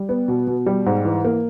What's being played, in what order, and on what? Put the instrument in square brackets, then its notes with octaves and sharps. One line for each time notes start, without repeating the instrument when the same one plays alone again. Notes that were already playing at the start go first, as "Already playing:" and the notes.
Already playing: [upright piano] G3
B3
B2
B2
G3
G#2
E3
A#3